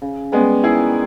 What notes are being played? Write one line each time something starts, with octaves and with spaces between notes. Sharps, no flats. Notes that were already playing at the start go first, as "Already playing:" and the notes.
C#3
G3 G#3 B3 C#4
D#3 E4 G#4